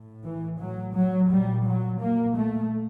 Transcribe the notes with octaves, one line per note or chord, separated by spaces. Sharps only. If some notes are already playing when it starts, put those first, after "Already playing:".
Already playing: A2
E3
A2 F#3
F#3
A#2 G3
F#3
A#2 A#3
A3